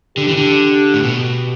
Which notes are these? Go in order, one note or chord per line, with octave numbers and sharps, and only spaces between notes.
D3 G4
E3
D3
A2
B2 G4